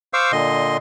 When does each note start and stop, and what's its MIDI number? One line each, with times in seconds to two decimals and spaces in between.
0.13 0.32 72
0.13 0.32 77
0.13 0.32 85
0.13 0.32 86
0.13 0.32 88
0.32 0.77 46
0.32 0.77 50
0.32 0.77 75
0.32 0.77 84